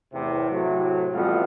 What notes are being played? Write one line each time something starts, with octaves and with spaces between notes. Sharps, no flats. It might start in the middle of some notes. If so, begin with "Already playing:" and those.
E2 A2 C3
A2 C3 F#3
A1 F2 G3 B3 F4 F#4